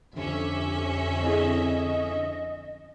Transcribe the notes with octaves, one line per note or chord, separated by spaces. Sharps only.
F2 D3 C#4 G4 E5
C4 E4 G#4 D#5